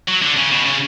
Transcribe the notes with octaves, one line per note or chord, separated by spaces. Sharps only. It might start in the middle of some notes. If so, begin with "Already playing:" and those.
F#3
D3
C#3
B2
C#3